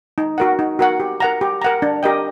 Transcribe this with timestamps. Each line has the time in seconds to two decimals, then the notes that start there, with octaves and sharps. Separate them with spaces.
0.18 D#4
0.38 F#4 A#4 F#5
0.59 D#4
0.79 F#4 A#4 F#5
1.00 G4
1.20 A#4 F#5 A#5
1.41 G4
1.62 A#4 F#5 A#5
1.82 D4
2.03 G4 A#4 D#5 G5